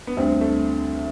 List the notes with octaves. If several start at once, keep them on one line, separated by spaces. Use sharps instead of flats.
B3
D2 D3 G3 C4
A3